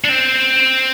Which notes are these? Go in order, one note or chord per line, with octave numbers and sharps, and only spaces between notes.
D4
C4